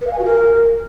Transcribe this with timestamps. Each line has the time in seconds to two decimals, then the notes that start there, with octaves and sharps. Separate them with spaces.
0.01 B4
0.07 F5
0.13 G#5
0.19 F#4
0.25 A#4